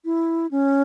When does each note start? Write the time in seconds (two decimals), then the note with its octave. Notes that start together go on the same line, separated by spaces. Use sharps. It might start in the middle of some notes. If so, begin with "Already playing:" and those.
0.05 E4
0.51 C#4